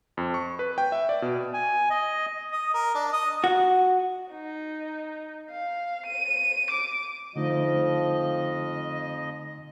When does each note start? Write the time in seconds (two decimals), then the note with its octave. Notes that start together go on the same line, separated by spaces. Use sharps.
0.17 F2
0.34 C#6
0.59 B4
0.78 G5
0.92 E5
1.09 D5
1.22 B2
1.54 G#5
1.90 D#5
2.52 D#5
2.74 A#4
2.95 D4
3.13 D#5
3.44 F#4
4.32 D#4
5.51 F5
6.07 D#7
6.71 D6
7.36 F2 D3 F3 A3 D#4 D#5